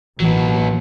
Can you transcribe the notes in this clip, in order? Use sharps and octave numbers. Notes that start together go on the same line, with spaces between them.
A1 D#2 E3 F#3 B3